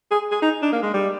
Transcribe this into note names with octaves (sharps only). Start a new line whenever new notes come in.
G#4
G#4
D#4
D4
A#3
G#3
G3